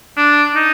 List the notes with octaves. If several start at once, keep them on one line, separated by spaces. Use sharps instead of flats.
D4
D#4